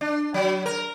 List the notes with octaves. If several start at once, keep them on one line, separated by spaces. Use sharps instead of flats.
D4
F#3
A#4